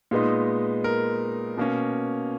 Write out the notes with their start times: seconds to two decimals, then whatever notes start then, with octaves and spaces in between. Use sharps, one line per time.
0.11 A#2 G#3 B3 D#4
0.84 A#4
1.58 B2 A#3 C#4